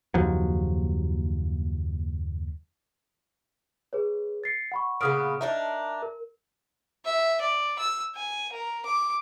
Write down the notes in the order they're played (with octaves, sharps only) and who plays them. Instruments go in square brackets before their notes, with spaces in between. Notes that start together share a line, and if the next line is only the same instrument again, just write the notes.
[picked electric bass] F#1 D#2 F3 F#3
[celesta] G#4 B4 C#5
A6 C7 C#7
F#5 B5 C#6
[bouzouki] A#2 C#3 B3 [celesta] D#6 F6 D7
[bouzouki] D4 D#4 A#4 [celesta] E5
[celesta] A#4
[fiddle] E5
D5
E6
G#5
A#4
D6